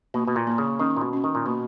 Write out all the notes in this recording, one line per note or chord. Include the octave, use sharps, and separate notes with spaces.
B2 A#3
B2
A#2
A#3
C#3
D#3 C#4
A#2
B2
C#4
D#3
A#2
B2 A#3